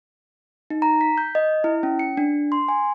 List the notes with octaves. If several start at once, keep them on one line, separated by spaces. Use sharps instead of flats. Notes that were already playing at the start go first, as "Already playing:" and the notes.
D#4
A#5
B6
G6
D#5
E4
C#4
C#7
D4
C6
G#5